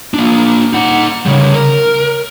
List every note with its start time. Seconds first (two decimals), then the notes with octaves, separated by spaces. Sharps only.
0.14 A#3 D4
0.73 D#4 F#5
1.26 C#3 G3
1.53 A#4